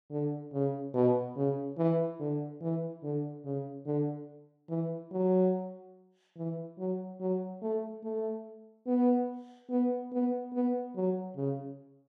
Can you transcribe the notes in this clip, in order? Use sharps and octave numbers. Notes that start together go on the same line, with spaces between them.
D3
C#3
B2
C#3
E3
D3
E3
D3
C#3
D3
E3
F#3
E3
F#3
F#3
A3
A3
B3
B3
B3
B3
F#3
C#3